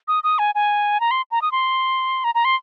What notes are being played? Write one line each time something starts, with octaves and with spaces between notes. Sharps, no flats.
D#6
D#6
G#5
G#5
A#5
C6
A#5
D#6
C6
A#5
A#5
C6